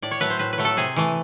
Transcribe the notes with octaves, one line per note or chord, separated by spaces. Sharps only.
A2 D5
C#5
F#3 A3 B4
C5
A2 B4
B4
F#3 A3
A4
C3 G#4
E3 A3